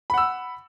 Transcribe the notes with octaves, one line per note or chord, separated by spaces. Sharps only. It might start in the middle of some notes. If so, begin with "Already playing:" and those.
F#5 B5 E6